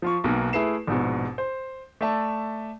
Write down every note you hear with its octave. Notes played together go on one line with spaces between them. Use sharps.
F3 F4 C#6
B1 B2 A#3 D#4
A3 E4 G#4 B4 C7 E7
A#1 G#2 B2
C5
A3 D5 E5 A5